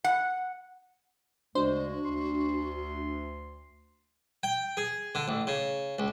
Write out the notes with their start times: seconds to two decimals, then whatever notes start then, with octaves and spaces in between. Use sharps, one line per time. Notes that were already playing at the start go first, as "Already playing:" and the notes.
0.04 F#5
1.55 D2 C#3 G#3 D4 F#4 C5
2.05 D2 C6
4.43 G5
4.77 G#4
5.15 D3
5.28 A1
5.47 C#3
5.99 C#2